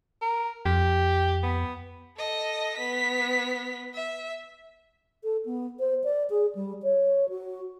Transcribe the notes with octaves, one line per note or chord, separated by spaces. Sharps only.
A#4
F2 G4
B3
A4 D#5
B3 B6
E5
A4
B3
C5
D5
G#4
G3
C#5
F#4